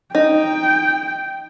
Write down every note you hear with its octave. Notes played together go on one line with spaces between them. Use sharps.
D#4 G5